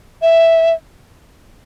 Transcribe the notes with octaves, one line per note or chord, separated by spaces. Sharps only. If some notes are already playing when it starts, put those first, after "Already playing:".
E5